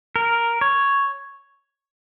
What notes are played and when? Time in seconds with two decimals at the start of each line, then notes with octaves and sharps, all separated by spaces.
0.16 A#4
0.61 C#5